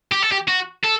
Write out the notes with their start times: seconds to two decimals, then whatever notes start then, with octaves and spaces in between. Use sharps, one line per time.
0.12 G4
0.22 A4
0.32 G4
0.48 F#4
0.84 A4